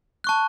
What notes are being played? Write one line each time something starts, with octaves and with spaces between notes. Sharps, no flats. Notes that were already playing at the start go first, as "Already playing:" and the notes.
A5 C#6 F#6